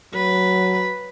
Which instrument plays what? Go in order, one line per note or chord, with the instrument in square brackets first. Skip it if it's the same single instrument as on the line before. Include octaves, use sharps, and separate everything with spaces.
[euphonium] F#3 [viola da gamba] B4